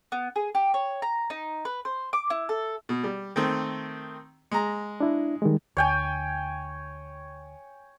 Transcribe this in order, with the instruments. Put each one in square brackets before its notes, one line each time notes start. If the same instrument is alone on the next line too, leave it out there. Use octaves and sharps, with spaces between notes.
[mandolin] B3
G#4
G4
C#5
A#5
D#4
B4
C5
D6
E4
A4
[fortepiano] B2
G3
D#3 A3 C4
G#3 A#5
[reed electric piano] D4 E4
D#3 G3 G#3
[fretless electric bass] D2 [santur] C#5 G5 G#5